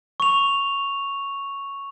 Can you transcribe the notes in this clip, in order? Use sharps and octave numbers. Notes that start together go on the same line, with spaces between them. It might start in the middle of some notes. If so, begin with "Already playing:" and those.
C#6 F7